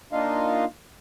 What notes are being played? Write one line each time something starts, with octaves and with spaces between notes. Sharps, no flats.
A#3 D4 D#4 F4 D#5 F5